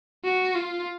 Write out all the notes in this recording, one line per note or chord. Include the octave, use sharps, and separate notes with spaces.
F#4
F4